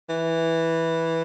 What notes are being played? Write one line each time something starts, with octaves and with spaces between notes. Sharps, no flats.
E3